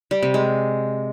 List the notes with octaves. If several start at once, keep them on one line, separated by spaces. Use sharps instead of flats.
G3
C3
G#3